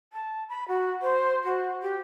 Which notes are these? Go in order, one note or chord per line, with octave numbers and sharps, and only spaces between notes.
A5
B5
F#4
C5
F#4
G4